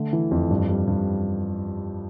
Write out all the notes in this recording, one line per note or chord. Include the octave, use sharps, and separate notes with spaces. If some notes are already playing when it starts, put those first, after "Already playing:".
Already playing: D3 A3
E3
F2
G2
G3
G2